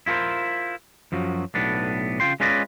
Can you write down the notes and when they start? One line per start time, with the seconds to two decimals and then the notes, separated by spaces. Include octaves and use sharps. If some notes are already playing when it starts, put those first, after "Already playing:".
0.06 E4 F4 G#4 A#4 C5
1.12 F#2 F3 F#3
1.55 B1 A2 B3 D4
2.20 C#3 A3 F4 G5 C6
2.40 G#3 C#4 F4 B4 D5 D#5